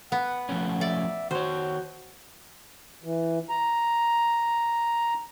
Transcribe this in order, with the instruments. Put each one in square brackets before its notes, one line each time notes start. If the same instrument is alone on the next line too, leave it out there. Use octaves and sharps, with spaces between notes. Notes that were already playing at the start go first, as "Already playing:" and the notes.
[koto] B3 [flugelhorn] F#5
[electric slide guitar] F3 A3 C#4
[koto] D5 [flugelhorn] E5
[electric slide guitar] D#3 C#5 [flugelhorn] F#4 [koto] C5
[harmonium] E3
A#5